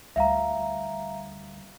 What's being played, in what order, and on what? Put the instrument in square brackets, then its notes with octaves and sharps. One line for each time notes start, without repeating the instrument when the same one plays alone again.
[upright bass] D2 G3 [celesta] E5 F5 A#5